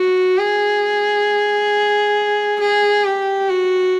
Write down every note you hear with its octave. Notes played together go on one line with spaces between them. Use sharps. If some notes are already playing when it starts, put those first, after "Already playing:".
Already playing: F#4
G#4
G#4
G4
F#4